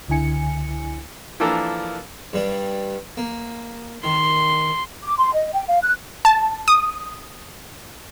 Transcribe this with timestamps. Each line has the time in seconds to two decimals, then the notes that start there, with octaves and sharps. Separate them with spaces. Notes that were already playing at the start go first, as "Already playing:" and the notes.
0.08 C#2 D3 E4 G#5 C#7
1.40 E3 F3 A#3 D4 A4 A#4
2.33 G2 G3 D4
3.17 A#3
4.04 D#3 C6
5.02 D6
5.18 C6
5.33 D#5
5.53 G5
5.68 F5
5.83 F#6
6.25 A5
6.68 D#6